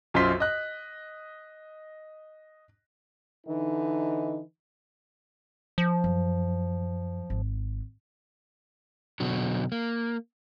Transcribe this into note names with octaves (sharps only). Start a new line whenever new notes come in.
B1 F#2 F4 C5 C6 B6
D#5 F#6
D3 E3 D#4
F3
F#2
G#1
B2 D3 F#3
A#3